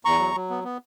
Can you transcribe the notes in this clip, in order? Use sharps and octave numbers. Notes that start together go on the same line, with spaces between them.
E2 A#5 C#6
F#3
F#3
B3
B3